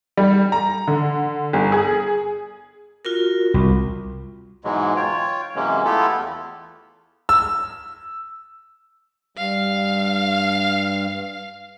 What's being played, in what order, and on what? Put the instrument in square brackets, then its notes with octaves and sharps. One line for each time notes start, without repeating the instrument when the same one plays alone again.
[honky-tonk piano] G3
A#5
D3
G1
G#4
[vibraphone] F4 F#4 A#4
[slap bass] C2
[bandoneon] G#2 B2 E3 F#3 G#3
F4 C#5 G5
C3 E3 F#3 G#3 A#3 C#4
A3 B3 E4 F4 G4 A4
E2
[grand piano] E6
[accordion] G2 [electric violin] F5